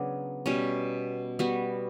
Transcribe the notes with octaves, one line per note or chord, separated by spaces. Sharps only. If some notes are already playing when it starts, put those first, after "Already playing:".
Already playing: C#3 F#3 B3 D4
B2 G3 C#4
G3 B3 F#4